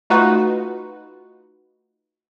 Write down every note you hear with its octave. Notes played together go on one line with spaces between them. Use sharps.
A3 D#4 F4 F#4 B4 F#5